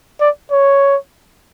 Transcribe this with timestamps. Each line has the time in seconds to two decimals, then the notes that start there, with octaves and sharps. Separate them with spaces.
0.21 D5
0.51 C#5